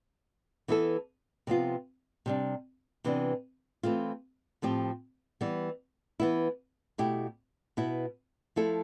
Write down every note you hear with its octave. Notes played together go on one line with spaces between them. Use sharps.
E3 B3 E4 A4
C3 F3 B3 F4
C3 G3 D4
C3 E3 B3 D4
E3 A3 C4 F4
A2 F3 C4 G4
E3 G3 B3
E3 B3 E4
B2 A3 E4 G4
B2 B3 E4
F3 A3 E4 A4